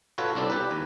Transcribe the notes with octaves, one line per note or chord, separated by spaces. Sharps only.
F4 F#4 A4 B4 C#5 F5
C2 C4 D4 A4
G4 B4
D#2